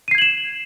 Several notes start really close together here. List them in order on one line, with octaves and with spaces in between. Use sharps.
D#7 C7 G#6 F#7 E7